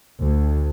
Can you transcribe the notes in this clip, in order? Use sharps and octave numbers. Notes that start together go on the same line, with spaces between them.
D2